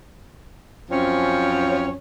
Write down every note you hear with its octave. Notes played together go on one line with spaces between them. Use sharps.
F#2 F3 C4 C#4 C#5